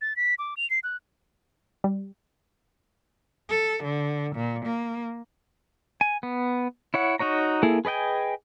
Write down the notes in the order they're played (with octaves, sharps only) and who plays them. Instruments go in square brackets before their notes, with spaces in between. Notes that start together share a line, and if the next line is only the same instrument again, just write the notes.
[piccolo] A6
B6
D6
F7
C7
F#6
[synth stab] G3
[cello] A4
D3
A#2
A#3
[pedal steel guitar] G#5
B3
E4 C#5 F#5
D#4 F#4 C#5 A#5
A#3 E4 G#4 A4
G#4 B4 D#5 G5 G#5